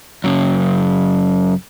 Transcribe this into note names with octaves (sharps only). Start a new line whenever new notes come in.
F#2 C#3